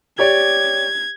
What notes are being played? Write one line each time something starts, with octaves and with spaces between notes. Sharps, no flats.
G4 C#5 D5 G#6